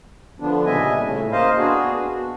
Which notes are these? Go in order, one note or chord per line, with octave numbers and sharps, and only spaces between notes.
D3 F3 B3 D4
A#2 C#3 G3 D#5 E5 G#5
A2 C#3
A#3 C5 D#5 F5
B3 D4 F#4 G#4
F#4